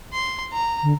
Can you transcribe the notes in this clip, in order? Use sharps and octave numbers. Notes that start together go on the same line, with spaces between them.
C6
A#5
D3